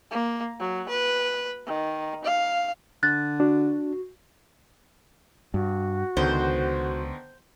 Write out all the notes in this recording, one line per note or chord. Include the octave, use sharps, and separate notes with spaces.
A#3
F#3
B4
D#3
F5
D3 F#6 A6
D4 F#4
G2 F#4
C#2 D3 D#3 B3 C5